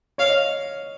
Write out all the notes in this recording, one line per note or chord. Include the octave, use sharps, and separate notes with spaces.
C#5 F5
D#5